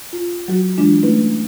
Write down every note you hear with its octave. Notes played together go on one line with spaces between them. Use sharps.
F4
F#3 F#4
E3 G#3 D4 F4
A3 C#4 E4 B4